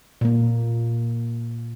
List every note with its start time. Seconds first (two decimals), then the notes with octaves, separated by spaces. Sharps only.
0.21 A#2 A#3